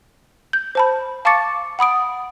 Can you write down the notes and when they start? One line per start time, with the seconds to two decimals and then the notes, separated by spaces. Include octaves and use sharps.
0.53 G6
0.75 C5 A5 B5
1.25 F5 A5 C#6 D6 A6 C#7
1.79 F#5 B5 D#6 D7